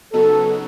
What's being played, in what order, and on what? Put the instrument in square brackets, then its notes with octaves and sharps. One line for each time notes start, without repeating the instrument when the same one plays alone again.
[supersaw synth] C#3 F#3 B3 D#4 F#4 [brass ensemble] A4